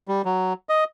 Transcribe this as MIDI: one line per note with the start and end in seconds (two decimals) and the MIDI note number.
0.08 0.22 55
0.25 0.53 54
0.69 0.84 75